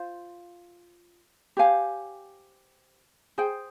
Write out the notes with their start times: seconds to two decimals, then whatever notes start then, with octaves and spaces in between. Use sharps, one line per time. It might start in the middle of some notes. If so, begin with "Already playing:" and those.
Already playing: F4 C5 F5
1.57 G4 C5 F5 G#5
3.38 G#4 C5 G5